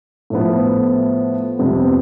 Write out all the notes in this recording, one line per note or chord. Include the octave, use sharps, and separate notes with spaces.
A2 F3 B3
F2 C3 G3 B3